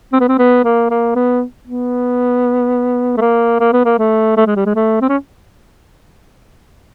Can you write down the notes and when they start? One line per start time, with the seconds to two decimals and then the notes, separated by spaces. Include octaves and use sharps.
0.13 C4
0.20 B3
0.28 C4
0.38 B3
0.64 A#3
0.90 A#3
1.16 B3
1.67 B3
3.17 A3
3.21 A#3
3.60 A#3
3.73 B3
3.85 A#3
3.98 A3
4.37 A3
4.46 G#3
4.56 G3
4.66 G#3
4.76 A3
5.01 C4
5.09 C#4